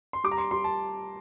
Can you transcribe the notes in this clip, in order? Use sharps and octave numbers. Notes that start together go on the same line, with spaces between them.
C6
G3 D6
A#5
C6
G3 C6
A5